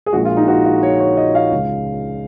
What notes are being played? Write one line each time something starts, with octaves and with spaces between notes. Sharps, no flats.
G#4
A#1 A#2 F3 G#3 F#4
F4
D#4
F#4
F4
C#5
C#5
D#5
F5
C#2 C#3 G#3